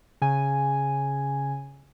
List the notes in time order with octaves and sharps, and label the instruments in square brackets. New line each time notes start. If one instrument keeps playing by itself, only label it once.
[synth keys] C#3 G#5